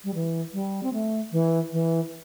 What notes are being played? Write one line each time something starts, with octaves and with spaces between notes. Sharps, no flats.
G3
E3
G3
C4
A3
E3
E3